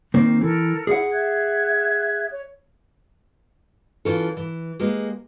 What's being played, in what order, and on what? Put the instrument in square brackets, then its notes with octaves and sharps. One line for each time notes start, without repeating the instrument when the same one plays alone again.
[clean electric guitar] D#3 A#3 C4
[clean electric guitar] E3 [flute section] A4 A#4
[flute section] E4 [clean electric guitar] G#4 F#5
[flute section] E5 F#6 G#6
C#5
[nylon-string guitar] E3 C#4 F4 A4
E3
G#3 A#3 G4 B4